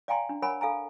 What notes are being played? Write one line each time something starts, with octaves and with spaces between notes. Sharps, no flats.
D5 F5 G5 G#5 A#5 C6
D4
A#4 C#5 F#5 G#5 B5
A4 F5 G#5 A#5